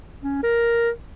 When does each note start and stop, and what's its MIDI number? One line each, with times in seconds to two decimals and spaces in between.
0.23 0.42 61
0.43 0.89 70